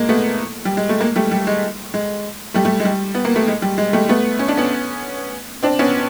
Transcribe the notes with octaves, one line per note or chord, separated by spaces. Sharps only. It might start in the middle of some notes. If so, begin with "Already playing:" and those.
Already playing: G#3 A#3
A3 B3
G3
G#3
A3
G#3 A#3
G3 A3
G3
G#3
G#3
G3 A3
G3 A3
G#3
G3
B3
A#3
A3
G#3
G3
G#3
G3 A3
A3 B3
C#4
D4
B3 C#4
C4 D4
B3 C#4